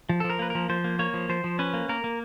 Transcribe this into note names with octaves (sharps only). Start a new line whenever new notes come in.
F3
F3 A4
A#4
A#3 B4
F3 A#4
F3 C5
A#3
A#3 C#5
F3
F3 C5
F3
C#4 B4
A#3
A#3 A#4
A#3